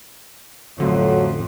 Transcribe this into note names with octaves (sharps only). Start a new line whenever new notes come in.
A1 F2 D3 F#3 A3